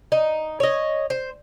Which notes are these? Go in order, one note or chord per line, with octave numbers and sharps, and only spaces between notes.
D#4
C#5 D#5
C5